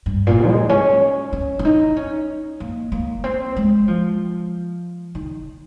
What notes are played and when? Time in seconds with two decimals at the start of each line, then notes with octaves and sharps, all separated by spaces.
0.06 G2
0.27 A#2
0.48 G#3
0.69 C#4
1.33 C#4
1.59 C#4
1.65 D#4
1.97 C#4
2.60 A#3
2.92 A#3
3.24 C4
3.56 G#3
3.88 F3
5.15 D#3